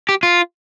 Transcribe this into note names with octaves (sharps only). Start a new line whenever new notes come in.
G4
F4